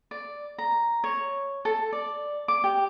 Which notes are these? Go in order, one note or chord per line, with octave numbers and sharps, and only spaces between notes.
D5
A#5
C#5
A4
D5
D6
G4